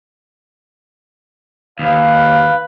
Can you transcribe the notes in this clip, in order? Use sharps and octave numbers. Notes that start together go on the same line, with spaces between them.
D#2 B4 F5